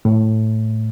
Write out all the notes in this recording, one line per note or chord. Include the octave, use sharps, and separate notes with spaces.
A2